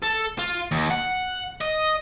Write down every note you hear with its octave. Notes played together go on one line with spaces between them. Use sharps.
A4
F4
D#2
F#5
D#5